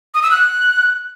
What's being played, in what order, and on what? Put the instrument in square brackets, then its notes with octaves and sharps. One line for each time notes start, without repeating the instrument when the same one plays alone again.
[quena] D#6
E6
F#6